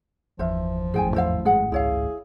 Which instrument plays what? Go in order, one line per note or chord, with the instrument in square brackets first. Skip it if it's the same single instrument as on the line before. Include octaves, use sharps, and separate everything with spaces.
[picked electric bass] G1 E2 [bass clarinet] F3 [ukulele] C5 E5
[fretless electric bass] G#1 F#2 A2 [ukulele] G#4 G5 G#5
[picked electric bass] E2 [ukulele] E4 C5 F5
[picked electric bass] G#3 [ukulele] G#4 F#5
[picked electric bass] C#2 [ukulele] E4 C#5 F5 [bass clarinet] G#4